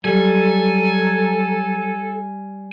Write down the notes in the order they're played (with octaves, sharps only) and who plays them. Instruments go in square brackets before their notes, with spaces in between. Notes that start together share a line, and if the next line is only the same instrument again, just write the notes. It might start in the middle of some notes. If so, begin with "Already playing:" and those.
[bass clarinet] F#3 [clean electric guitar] G3 [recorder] A4 [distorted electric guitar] G#5